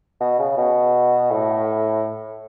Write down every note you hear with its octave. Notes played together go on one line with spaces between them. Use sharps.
B2
C#3
B2
A2